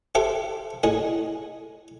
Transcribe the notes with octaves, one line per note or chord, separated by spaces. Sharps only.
G4 A4 C5 E5
A2 G#4 D#5